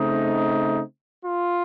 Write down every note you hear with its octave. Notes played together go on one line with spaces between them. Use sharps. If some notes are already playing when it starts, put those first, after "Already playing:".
Already playing: C#3 A3 C4 D#4
F4